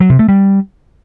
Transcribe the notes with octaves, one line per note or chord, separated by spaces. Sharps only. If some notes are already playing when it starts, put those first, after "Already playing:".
F#3
C3
A3
G3